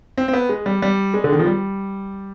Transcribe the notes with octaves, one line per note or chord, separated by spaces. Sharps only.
C4
C4
B3
G#3
G3
G3
G#3
D3
D#3
F3
G3